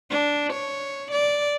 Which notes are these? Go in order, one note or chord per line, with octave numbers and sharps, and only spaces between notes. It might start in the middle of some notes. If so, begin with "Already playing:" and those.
D4
C#5
D5